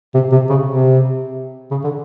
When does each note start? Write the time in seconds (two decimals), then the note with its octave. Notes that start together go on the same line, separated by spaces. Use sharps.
0.14 C3
0.32 C3
0.50 C#3
0.67 C3
1.71 C#3
1.84 D3